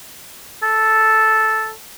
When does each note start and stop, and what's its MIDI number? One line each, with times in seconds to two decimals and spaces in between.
0.63 1.71 69